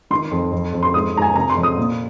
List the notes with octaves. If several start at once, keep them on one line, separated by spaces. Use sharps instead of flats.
D#3 C6
F2
F2
F2
C6
G#2 D#6
G#2 A#5
G#5
C3 A#5
C6
F2
D#6
A#2